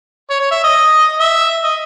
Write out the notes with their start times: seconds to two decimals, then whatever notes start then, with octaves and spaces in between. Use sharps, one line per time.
0.30 C#5
0.40 C#5
0.51 E5
0.64 D#5
1.20 E5
1.64 D#5